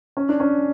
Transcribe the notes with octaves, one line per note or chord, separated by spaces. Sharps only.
C#4
D4
C#4